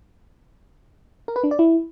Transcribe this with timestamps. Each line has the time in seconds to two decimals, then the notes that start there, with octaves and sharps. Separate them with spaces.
1.28 A#4
1.36 B4
1.44 D4
1.51 D5
1.59 E4